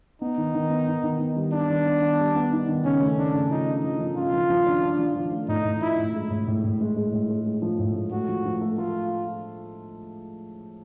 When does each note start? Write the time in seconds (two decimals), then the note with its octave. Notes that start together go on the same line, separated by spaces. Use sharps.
0.21 B3 D#4
0.38 D#3
0.55 D#3
0.70 B3
0.88 D#3
1.04 D#3
1.20 B3
1.36 G3
1.53 D4 D#4
1.70 D#3
1.86 B3
2.02 B3
2.19 G3
2.36 B3
2.52 D#4
2.69 D#3
2.85 C#3 C#4
3.01 A3
3.18 C#3 D4
3.34 C#3
3.50 F3 D#4
3.67 D4
3.83 F3 D#4
4.01 F3
4.17 C#3 F4
4.33 F3
4.50 F3
4.66 D4
4.83 D4
4.99 F3
5.16 F3
5.32 A3
5.48 A2 D#4
5.64 A2
5.81 F3 E4
5.98 A2
6.14 G#3
6.30 A2
6.47 A2
6.64 A2
6.81 G#3
6.96 G#3
7.13 A2
7.29 G#3
7.46 G#3
7.62 F3
7.79 A2
7.95 G#3
8.12 A3 F#4
8.28 F3
8.45 F3
8.61 A3
8.78 A3 F4